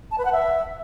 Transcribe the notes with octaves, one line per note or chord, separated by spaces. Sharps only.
A5
B4
F#5
E5